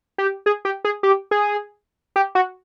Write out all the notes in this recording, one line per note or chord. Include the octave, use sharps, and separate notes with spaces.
G4
G#4
G4
G#4
G4
G#4
G4
F#4